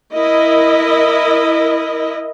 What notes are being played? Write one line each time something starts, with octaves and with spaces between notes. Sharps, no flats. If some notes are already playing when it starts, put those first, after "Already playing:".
E4 A#4 D#5